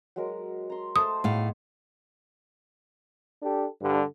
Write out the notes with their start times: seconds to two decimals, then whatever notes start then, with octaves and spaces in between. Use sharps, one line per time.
0.16 F#3 G#3 A#4
0.70 A#5 C6
0.96 A3 C5 A5 D#6
1.24 A2 B3 D#4 G#4 F5
3.41 D4 G4 A4
3.82 G2 D3 G3